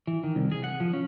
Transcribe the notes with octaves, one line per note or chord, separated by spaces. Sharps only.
E3
D#3
C2
G#4
F#5
F3
C#4